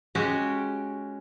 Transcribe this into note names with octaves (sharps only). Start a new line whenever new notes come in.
G#3 C#4 F#4 G4